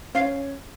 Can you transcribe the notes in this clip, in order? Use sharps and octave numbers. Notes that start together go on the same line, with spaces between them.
C#4 F5